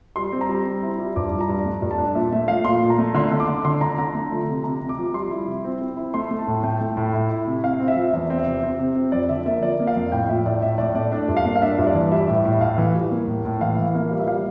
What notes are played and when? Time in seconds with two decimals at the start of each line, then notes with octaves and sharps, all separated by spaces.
0.16 G3 C6
0.32 C4
0.41 A#5
0.49 G3
0.66 C4
0.82 E4
0.99 G3
1.16 G2 D6
1.33 F3
1.41 A#5
1.49 G2
1.65 A3
1.82 G2
1.91 A5
1.98 D4
2.15 A#2 E5
2.32 A3 E5
2.48 F3 F5
2.65 A#2 C6
2.82 A#2
2.90 A#5
2.98 A3
3.15 D3 C6
3.31 D3
3.40 D6
3.48 D3
3.65 D3 C6
3.81 D3 A#5
3.98 D3 A#5
4.15 A3
4.31 F3
4.48 C3
4.64 C3 A#5
4.81 C3
4.89 D6
4.98 F3
5.14 G3 C6
5.31 E4
5.47 C3
5.64 C4
5.81 C4
5.97 E4
6.14 A3 C6
6.31 A3
6.39 A5
6.47 A2
6.63 A3 G5
6.81 A3
6.97 A2
7.13 E4
7.30 E4
7.47 C3
7.64 C3 F5
7.80 C4
7.88 E5
7.96 F3
8.13 E2 E5
8.30 C4
8.39 E5
8.46 C3
8.63 C4
8.79 C3
8.96 C4
9.12 F2 D5
9.29 D3 E5
9.46 A#3 E5
9.63 F3 D5
9.80 A#3
9.87 F5
9.96 F2
10.12 A2 G5
10.29 F3 E5
10.46 A2 D5
10.62 A2 E5
10.78 A2 D5
10.95 A3 D5
11.12 D4 E5
11.28 G2
11.37 F5
11.45 A#3
11.56 F5
11.61 D4 E5
11.78 G2
11.87 D5
11.94 E3
12.12 G3 E5
12.28 A2
12.36 E5
12.45 A2
12.50 E5
12.61 A2 F5
12.78 E3
12.95 G3
13.11 A#3
13.27 A2
13.45 A2
13.61 E3 F5
13.78 E3
13.95 A#3 F5
14.11 G3
14.20 E5
14.27 G3 F5